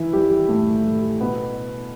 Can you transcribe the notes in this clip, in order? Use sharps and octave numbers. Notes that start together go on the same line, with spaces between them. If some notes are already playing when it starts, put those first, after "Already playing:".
Already playing: E3 E4
G3 G4
A2 A3
G3
B2 B3